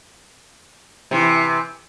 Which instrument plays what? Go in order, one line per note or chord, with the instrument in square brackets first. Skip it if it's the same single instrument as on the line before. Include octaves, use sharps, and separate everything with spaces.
[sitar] C3 E3